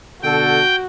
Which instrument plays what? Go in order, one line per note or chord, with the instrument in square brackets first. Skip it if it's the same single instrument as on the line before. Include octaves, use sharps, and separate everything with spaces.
[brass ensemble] B2 D3 A4 [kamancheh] F#4 [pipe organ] G5